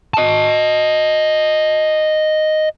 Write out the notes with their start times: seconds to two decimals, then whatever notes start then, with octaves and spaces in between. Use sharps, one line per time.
0.14 D#5 A5